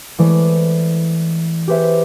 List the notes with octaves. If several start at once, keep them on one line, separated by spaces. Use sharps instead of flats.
E3 G#3 A3 C5 D5
G4 G#4 B4 C5 E5